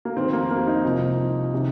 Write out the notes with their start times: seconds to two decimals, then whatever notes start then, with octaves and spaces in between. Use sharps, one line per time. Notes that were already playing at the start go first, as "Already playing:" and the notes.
0.05 A#3
0.17 F2 D#3 C4
0.33 A#3
0.51 A#3
0.67 D#4
0.84 C2 C3 F3
1.54 C3 D#3